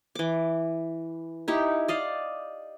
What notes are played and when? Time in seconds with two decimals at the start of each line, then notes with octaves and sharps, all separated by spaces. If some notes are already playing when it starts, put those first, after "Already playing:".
0.15 E3 D6
1.48 D#4 E4 G4
1.88 D5 D#5 F5